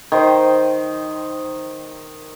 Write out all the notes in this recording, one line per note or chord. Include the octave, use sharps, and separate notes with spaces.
D#3 C5